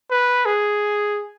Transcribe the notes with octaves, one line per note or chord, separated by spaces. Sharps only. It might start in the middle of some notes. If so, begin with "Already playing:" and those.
B4
G#4